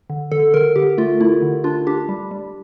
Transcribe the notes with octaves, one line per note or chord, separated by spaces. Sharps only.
D3
D3 A4
D3 A#4
D3 G4
A3 F4
A3 E4
D3
D4 F4
D4 G4
G3
G3